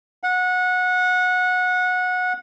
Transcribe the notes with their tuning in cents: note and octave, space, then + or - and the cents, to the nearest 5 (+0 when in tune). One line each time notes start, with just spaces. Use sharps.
F#5 -20